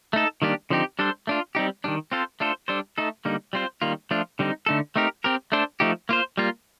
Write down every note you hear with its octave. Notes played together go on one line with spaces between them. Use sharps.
A3 D#4 A4
D#3 G3 A#3 D4 G4
D3 F3 C4 D#4 G4
G3 D4 A4 C5
A3 D4 F4
G3 C4 D#4 G4
D#3 G3 D4
C4 F4 A4 C5
A3 D4 F4 A4 C5
G3 D4 A4 C5
A3 D#4 A4
D3 G3 A#3 D#4
G3 C4 F4 C5
D#3 G3 A#3 F4
F3 A3 D4 F4
D3 G3 C4 D#4
D3 A3 D#4 A4
A3 C4 D#4 G4 A#4
C4 G4 A#4
A3 D4 A4 C5
F3 A3 D#4 G4
A#3 F4 C5
G3 A#3 F4